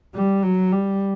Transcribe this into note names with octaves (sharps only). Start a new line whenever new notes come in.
G3
F#3
G3